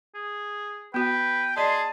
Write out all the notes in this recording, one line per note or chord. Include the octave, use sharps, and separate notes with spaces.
G#4
B3 F#4 B4 G5
G#4 D5 D#5 A5 C6